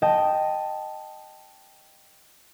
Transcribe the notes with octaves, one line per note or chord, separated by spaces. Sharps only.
D#5 G5 A5